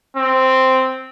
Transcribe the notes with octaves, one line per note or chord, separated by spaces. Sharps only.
C4